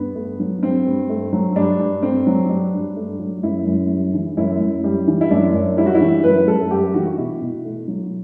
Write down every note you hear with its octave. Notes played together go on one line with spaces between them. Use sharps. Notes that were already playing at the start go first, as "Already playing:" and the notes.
Already playing: G2 B3
A3
F#3
G2 C4
G2
A3
F#3
G2 D4
G2
A3 C4
F#3
G2 D4
G2
A3
F#3
F#2 E4
F#2
G3
E3
F#2 E4
F#2
G3
E3
E4
F#2 D4
F#2
G3 E4
F#4
E4
E3
F#2 B4
F#2 A4
G3 G4
E3 F#4
F#4
B2 E4
B2
A3
F#3